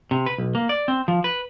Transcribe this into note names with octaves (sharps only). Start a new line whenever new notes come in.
C3
B4
B1
A#3
D5
C4
F3
B4